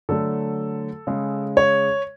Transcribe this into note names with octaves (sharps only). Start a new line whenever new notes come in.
D3 F#3 A3 A4
C#3 G#3
C#5